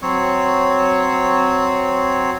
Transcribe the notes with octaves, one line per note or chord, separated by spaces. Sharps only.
F#3 C4 C#5